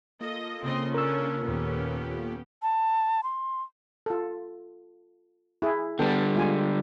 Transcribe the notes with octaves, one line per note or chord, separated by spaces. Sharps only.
A#3 F4 A4 D#5
C#3 C4 D#5 C6
C#4 D4 A#4 E6
D#2 A#2 B3 C#4 G4
A5
C6
F4 A4
E4 G#4
D3 G3 B3 A4 G5
G#3 F4 G#5